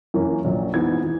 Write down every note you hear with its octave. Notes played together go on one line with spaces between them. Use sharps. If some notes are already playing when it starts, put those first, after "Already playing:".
F#2 E3 A#3 C#4
A#1 A#2 F#3
G#2 E3 B3 G#6
E3